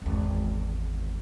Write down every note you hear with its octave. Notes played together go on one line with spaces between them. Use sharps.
G#1 E2